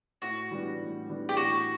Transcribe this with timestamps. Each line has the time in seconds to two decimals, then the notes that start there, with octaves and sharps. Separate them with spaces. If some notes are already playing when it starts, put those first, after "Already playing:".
0.22 A2 F#4
0.51 E3 G3 B3 D4
0.80 A2
1.08 E3 G3 B3 D4
1.29 G4
1.37 A2 F#4